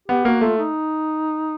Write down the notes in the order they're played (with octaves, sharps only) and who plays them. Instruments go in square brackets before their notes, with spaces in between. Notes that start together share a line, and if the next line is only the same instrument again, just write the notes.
[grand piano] B3 [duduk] G4
[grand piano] A#3 [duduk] F#4
[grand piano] A3 [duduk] F4
[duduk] D#4